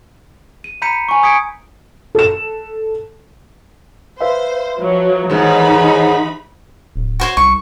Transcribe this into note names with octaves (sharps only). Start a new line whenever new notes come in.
D#7
A#5 B5 G6 B6 C#7 D#7
G#5 C#6
D#6 G#6 B6 C#7 D7
A4 E7
B4 C5 E5 F5
F3 F#3
D#2 G#2 E3 D#4 B5
D1
F#4 C5 C#5
C2 C#6